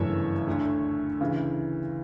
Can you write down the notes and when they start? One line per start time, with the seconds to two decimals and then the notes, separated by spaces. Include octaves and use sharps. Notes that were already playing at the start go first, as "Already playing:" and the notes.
Already playing: G1 F#2 C#3 E3 A3 C#5 E5
0.47 D2 D3 A3
1.21 D2 C#3 E3